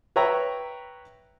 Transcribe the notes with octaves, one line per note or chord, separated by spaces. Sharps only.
B4 C#5 E5 G5 A#5